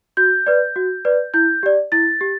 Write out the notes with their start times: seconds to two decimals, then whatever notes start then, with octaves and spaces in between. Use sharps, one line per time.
0.17 F#4 G6
0.46 B4 D5
0.76 F#4
1.05 B4 D5
1.34 E4 G6
1.63 G4 D5
1.92 E4 A6
2.21 G4